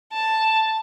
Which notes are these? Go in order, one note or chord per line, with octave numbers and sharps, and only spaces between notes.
A5